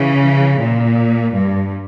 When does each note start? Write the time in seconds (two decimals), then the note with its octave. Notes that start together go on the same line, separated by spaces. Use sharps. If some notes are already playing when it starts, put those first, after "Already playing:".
Already playing: C#3 E3
0.60 A#2
1.33 G2